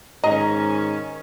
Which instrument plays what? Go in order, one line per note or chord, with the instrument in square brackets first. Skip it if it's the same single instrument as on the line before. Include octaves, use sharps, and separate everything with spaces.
[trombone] G#2 [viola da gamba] D#3 C#4 [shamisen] D#5 [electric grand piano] A#5